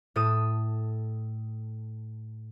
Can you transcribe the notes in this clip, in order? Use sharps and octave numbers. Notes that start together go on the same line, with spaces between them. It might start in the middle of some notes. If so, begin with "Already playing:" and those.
A2 A4 D#6 D#7